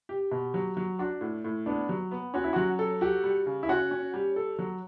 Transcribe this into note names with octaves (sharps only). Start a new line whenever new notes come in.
G4
B2
F#3
F#3
D4 F#4
A2
A2
B3 D4
F#3
B3
C#4 F#4
E4
F#3 F#4
A4
F#4 G4
G3
C#3
E4
C#4 F#4
C#4
G3
A4
F#3